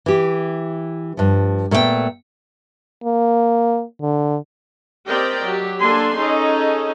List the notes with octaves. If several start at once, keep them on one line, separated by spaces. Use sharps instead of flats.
E3 G4
G2 F3
A#2 A3 B3 C#5 G5
A#3
D3
C4 G4 A#4 D5 D#5 G5
F#3 G4
A#3 D4 A4 G#5 C6
C#4 D#4 G#4 A4 D#5